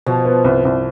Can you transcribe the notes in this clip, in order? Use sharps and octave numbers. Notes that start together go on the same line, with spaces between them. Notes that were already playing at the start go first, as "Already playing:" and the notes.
B2 F3
B3
C2
C2